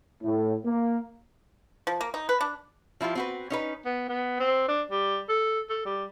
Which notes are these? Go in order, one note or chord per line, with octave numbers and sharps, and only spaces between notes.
A2
A#3
F3
A#3
D#4
B4
D4
F3 E4 F4 G4
C4 F#4 B4
C#4 D#4 B4
B3
B3
C4
D4
G3
A4
A4
G3